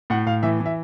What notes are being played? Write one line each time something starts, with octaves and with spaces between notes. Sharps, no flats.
A2 F#5
A2 F5
E3 E5
E3
E5